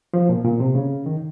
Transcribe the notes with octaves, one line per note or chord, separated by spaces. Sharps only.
F3
A#2
A#2
C3
C#3
D#3